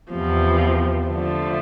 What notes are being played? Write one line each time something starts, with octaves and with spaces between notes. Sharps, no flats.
E2 C3 F3
D3 F3 A3